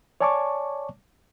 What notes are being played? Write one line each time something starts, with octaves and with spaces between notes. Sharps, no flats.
C#5 D5 G#5 A5 C#6 D6